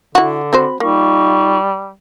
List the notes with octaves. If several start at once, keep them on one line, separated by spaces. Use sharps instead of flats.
D3 E4 F#4
C4 F#4 C5 B5
G3 A#3 D#4 F4 C#6